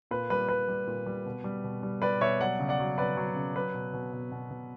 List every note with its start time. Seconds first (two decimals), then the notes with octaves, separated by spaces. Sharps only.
0.11 A#2 B4
0.30 G3 B4
0.48 G3 B4
0.68 G3
0.87 A#2
1.06 G3
1.26 B2
1.44 G3
1.64 B2
1.83 G3
2.02 G3 B4 D5
2.21 B2 C#5 E5
2.40 F#3 D5 F#5
2.59 C#3
2.69 D5 F#5
2.79 F#3
2.98 F#3 B4 D5
3.17 F#3
3.36 C#3
3.55 F#3 B4
3.74 B2
3.93 B2
4.13 B2
4.31 B2
4.51 B2